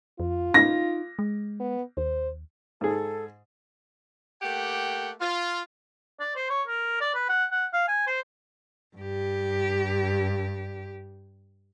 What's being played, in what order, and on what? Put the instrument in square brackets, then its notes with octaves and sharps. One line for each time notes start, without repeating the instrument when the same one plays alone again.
[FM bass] F2 [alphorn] F4
[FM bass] D#4 [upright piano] A#6
[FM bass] G#3
[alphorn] B3
[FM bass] D#2 [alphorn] C5
[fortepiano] G#2 G#4 [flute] A4
[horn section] A3 A#3 G4 F#5 G5
F4
[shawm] D5
C5
C#5
A#4
D5
B4
F#5
F#5
F5
G#5
C5
[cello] G2 G4